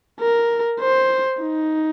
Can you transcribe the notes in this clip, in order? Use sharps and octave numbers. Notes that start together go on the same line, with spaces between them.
A#4
C5
D#4